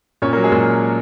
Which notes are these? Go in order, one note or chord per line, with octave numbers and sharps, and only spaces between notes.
A#2 C#4 C#5
F#3 A#3 A#4
G#3 G#4
A#2